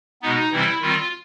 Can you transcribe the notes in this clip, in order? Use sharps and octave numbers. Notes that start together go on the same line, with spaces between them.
B2 G#3 B3 D#4
C3 E3 G3 C4 E4
D#3 G3 C4 F4